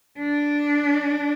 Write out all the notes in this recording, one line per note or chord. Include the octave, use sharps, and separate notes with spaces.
D4